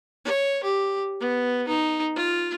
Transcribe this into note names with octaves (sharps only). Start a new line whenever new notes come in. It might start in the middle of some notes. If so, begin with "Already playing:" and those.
C#5
G4
B3
D#4
F4